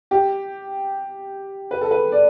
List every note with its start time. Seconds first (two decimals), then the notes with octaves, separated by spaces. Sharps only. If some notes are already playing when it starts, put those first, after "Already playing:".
0.11 G4
1.71 B4
1.81 A4
1.91 B4
2.12 D5